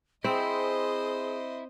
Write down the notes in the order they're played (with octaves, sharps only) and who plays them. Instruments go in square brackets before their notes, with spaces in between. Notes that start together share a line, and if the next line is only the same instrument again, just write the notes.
[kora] C4 [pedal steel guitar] E4 [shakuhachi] G#4 [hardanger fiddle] C5 D#5